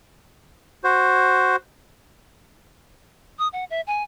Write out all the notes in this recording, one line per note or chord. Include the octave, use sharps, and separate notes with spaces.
F#4 C5
D#6
F#5
E5
G#5